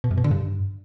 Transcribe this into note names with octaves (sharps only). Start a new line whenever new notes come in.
B2
F#2
B2
D3
G2